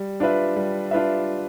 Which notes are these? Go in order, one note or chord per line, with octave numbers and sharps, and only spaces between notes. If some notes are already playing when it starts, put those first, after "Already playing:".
Already playing: G3
D4 F4 B4 E5
G3
D4 F4 B4 E5